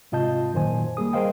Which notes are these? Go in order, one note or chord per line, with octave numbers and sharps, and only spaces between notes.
G#2 C3 F4 D#5 A5 G6
F#2 A#2 D#3 C5 G#5
G3 A#3 G#4 D#6
G#4 A#4 C5 D#5 F5 G5